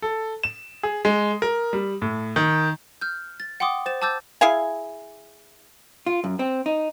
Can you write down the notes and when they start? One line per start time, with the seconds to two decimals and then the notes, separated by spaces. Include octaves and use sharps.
0.02 A4
0.43 E7
0.83 G#4
1.05 G#3
1.42 A#4
1.73 G3
2.02 A2
2.36 D#3
3.01 F6 G6
3.40 A6
3.60 F#5 G5 C6 D6 D#6
3.86 C5 A6 E7
4.02 A5 D6 E6 G6 A6
4.41 E4 G#4 F5 G#5
6.06 F4
6.24 F#2
6.39 C4
6.66 D#4